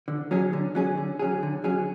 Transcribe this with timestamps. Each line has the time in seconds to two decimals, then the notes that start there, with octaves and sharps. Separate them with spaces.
0.08 D3
0.31 F#3 C#4 G#4
0.53 D3
0.75 F#3 C#4 G#4
0.97 D3
1.19 F#3 C#4 G#4
1.43 D3
1.64 F#3 C#4 G#4